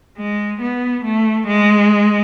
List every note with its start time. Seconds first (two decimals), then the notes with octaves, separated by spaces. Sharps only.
0.18 G#3
0.61 B3
1.04 A3
1.47 G#3